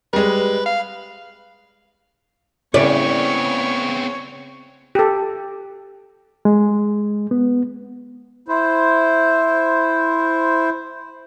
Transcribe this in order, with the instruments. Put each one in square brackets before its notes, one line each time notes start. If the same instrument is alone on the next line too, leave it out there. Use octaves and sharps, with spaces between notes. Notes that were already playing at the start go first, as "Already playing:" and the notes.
[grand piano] G3 G#3 [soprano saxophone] B4
[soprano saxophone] F5
[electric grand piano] C#3 E4 [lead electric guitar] B3 C4 [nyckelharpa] C#5 [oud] D5
[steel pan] G4 A4
[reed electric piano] G#3
B3
[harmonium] E4 C5